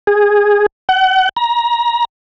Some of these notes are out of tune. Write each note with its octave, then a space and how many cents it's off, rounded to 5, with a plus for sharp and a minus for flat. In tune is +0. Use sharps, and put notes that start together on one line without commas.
G#4 -10
F#5 +35
A#5 +25